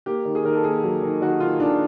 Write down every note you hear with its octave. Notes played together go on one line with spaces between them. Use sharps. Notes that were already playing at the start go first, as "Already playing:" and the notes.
A#3 G4
D#3
G#4
D#3 A#4
A4
A#3 G#4
F#3
D#3
D#3 F#4
D#3 F4
D#3 D4